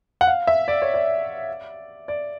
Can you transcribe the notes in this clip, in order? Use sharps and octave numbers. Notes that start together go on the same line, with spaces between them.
F#5
F5
E5
D5
C#5
D5
D5